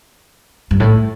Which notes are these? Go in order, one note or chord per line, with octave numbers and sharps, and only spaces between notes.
G2
A2